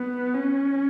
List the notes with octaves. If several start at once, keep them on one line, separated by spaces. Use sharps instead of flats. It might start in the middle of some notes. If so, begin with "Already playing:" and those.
Already playing: B3
C#4